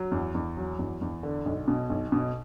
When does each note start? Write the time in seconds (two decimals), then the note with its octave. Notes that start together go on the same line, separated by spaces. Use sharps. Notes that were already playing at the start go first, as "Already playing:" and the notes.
Already playing: F#3
0.12 E2
0.35 E2
0.57 F#3
0.79 E2
1.01 E2
1.23 D3
1.46 B1
1.68 B2
1.90 B1
2.12 B2